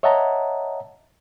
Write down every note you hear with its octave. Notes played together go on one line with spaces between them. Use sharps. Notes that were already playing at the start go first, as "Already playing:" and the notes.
C#5 D#5 E5 F#5 A5 A#5